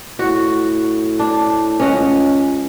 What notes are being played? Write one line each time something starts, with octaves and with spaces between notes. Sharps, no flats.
A2 F#4
D4
C#2 C#4 D#5 F#5